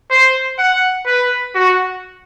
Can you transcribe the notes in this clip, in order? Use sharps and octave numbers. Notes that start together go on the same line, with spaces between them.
C5
F#5
B4
F#4